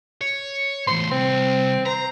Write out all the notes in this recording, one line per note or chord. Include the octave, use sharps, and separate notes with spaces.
C#5
E2 A2 C6
C2 C4
C5 A#5